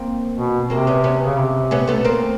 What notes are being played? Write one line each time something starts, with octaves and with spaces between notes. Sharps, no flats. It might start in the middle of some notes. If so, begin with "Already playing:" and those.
Already playing: A#3 C4
B2
C3 A#3 C4
B3 C#4
B3 C#4
C#3
C3
B3 C#4
A3 B3
A#3 C4